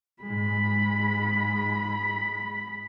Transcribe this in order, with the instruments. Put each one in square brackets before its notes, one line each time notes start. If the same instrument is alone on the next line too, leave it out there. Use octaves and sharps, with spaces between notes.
[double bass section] G#2 G#3 [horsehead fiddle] B5